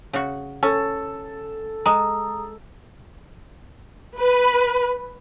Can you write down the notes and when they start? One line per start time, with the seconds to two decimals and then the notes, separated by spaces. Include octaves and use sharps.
0.13 C#3 F#4
0.63 C#4 A4
1.86 G#3 A#5 D#6
4.18 B4